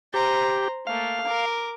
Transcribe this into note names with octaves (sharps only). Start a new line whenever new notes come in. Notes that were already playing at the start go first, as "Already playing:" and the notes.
G4 C5 A#5
A3 A#3 F5
A#4 D6